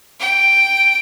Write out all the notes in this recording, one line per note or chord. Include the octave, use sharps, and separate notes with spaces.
G5